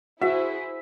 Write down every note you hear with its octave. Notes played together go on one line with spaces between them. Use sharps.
E4 F#4 G#4 C5 E5